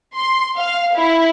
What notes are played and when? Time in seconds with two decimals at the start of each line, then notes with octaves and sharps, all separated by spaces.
0.17 C6
0.59 F5
0.96 E4